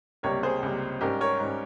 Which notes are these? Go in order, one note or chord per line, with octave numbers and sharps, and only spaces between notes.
C#2 C3 G3 A#3 A#4 C#5
G#4 C5
C#2 C3 G3 A#3
G#2 G3 C#4 G4 A#4
A#4 C#5
G#2 G3 C#4